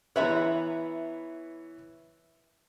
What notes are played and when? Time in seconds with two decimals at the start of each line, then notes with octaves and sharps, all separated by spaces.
0.16 E3 B3 B4 C#5 E5 A#5